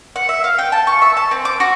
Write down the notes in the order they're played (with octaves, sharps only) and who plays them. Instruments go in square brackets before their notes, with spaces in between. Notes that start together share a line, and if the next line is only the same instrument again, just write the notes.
[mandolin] F#5
E5
F5
G5
A5
C#6
E5
A5
C4
D6
F#4